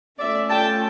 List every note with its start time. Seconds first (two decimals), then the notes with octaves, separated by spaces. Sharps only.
0.19 A3 C#4 F4 D5 E5
0.50 G5 A5